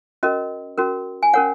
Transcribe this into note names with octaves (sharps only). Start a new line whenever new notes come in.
C#4 F#4 A#4 D#5
C#4 F#4 A#4
G#5
C#4 A#4 C#5 F#5